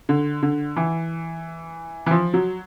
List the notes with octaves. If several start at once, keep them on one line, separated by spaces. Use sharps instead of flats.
D3
D3
E3
E3
F3
F#3